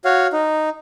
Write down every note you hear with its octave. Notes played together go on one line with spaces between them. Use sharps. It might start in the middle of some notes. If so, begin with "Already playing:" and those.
F#4 C#5 F5
D#4